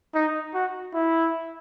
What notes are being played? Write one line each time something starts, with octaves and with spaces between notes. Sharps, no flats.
D#4
F#4
E4